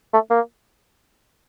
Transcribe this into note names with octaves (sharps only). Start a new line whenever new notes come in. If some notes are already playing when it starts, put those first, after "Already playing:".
A3
A#3